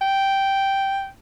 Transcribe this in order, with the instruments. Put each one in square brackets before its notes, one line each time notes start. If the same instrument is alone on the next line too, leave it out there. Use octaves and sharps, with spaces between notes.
[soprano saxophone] G5